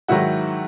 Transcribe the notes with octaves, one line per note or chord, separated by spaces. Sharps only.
G#2 D#3 F#3 E4 F#4